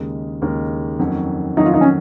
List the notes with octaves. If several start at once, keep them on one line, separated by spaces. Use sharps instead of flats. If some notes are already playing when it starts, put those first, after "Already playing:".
Already playing: D#2 C#3 G#3 D#4 A#4
D#2 C#3 G#3 D#4 A#4
F2 D#3 F#3 A#3 C#4
F2 D#3 F#3 A#3 C#4 D#4
F4
D#4
C#4